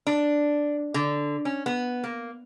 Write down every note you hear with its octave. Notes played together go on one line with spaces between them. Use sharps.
D4
D3
C#4
B3
A#3